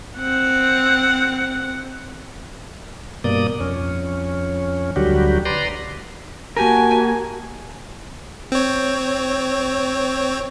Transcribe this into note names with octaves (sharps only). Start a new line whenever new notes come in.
C4 F#5
G2 B2 A#3 D5 D#6
F2 C#4
D2 D3 F#3 G3 F#4 G4
B4 D5 A#5 C6
A#3 F#4 G4 A#4 G#5 A5 G#6
C4 C#5